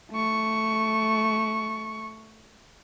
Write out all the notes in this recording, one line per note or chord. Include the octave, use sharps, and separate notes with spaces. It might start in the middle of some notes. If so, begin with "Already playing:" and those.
A3 C#6